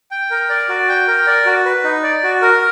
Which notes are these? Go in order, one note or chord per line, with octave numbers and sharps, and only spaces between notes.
G5
A#4
D5
F#4
G5
A#4
D5
F#4
B4
D#4
D5
F#4
A#4